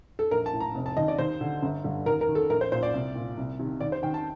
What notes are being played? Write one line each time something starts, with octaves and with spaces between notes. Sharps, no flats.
A4
A#1 A#4
A5
A2
A#5
F1
A5
D#2 D#3 D#5
D5
D#2 C5
D3
G1
G2 D3
D#2 A#4
A#4
D#3
A4
A#1 A#4
C5
A#2 C5
D5
C2
A#2
C2
C3 D#3
D#2 D5
C5
D#3 G5
A5